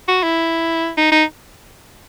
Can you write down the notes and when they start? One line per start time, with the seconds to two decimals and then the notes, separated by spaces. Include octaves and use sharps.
0.08 F#4
0.23 E4
0.97 D#4
1.12 D#4